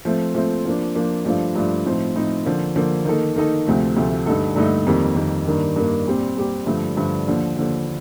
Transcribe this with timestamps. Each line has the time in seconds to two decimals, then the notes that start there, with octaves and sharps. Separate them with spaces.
0.05 F3 A3 C4
0.35 F3 A3 C4
0.65 F3 A#3 D4
0.95 F3 A#3 D4
1.25 G2 F3 A3 D4 F4
1.55 G2 F3 A3 D4 F4
1.85 A2 F3 C4 D#4
2.15 A2 F3 C4 D#4
2.45 D3 F3 A#3
2.76 D3 F3 A#3
3.05 D#3 A#3 D#4 A4
3.36 D#3 A#3 D#4 A4
3.66 D2 C3 F3 A3
3.96 D2 C3 F3 A3
4.26 G2 D3 A3 D#4 A4
4.56 G2 D3 A3 D#4 A4
4.87 F2 D#3 G3 A#3
5.16 F2 D#3 G3 A#3
5.46 G2 D#3 A#3 D4
5.76 G2 D#3 A#3 D4
6.07 A#2 G3 C4 G4
6.36 A#2 G3 C4 G4
6.66 G2 D3 F3 A3
6.97 G2 D3 F3 A3
7.27 D#2 D3 F3
7.57 D#2 D3 F3